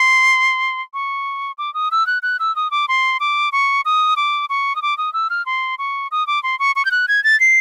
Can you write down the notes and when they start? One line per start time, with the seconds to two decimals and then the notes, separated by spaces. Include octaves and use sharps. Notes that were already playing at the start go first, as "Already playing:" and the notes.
Already playing: C6
0.94 C#6
1.58 D6
1.74 D#6
1.91 E6
2.07 F#6
2.23 F#6
2.40 E6
2.56 D#6
2.71 D6
2.88 C6
3.20 D6
3.52 C#6
3.85 D#6
4.16 D6
4.50 C#6
4.76 D#6
4.82 D6
4.98 D#6
5.13 E6
5.30 F6
5.46 C6
5.78 C#6
6.12 D#6
6.27 D6
6.43 C6
6.59 C#6
6.76 C#6
6.85 G6
6.91 F#6
7.08 G#6
7.24 A6
7.40 C7